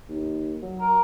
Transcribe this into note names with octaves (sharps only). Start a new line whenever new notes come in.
D#2
F#3
A#4